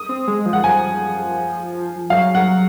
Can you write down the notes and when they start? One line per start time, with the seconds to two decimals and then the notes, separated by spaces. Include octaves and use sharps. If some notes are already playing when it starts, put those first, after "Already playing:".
Already playing: D#6
0.09 C4
0.28 G#3
0.46 F3
0.53 F#5
0.63 F3 G#5
2.10 F#3 F5
2.35 F#5